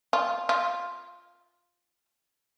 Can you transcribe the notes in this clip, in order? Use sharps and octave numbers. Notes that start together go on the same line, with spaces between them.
F4
F4